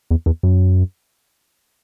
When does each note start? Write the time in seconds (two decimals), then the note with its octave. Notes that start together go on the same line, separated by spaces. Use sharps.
0.11 E2
0.26 E2
0.43 F#2